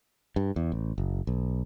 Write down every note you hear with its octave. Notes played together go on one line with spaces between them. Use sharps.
G2
E2
A1
F#1
B1